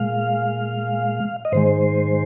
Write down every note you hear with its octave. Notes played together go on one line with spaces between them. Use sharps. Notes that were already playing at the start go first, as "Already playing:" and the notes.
Already playing: A#2 G#3 F5
D#5
G#2 D#3 G#3 C5